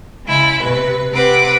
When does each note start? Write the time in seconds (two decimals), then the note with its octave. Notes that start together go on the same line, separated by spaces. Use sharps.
0.25 C#3 G#3 E4
0.58 C3 B4
1.11 C3 C4 B4 F#5 D6